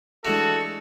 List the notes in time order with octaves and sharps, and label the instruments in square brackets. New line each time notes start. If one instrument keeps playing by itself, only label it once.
[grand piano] E3 D4 F7 [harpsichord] G#3 A3 [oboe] F#4 [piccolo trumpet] A4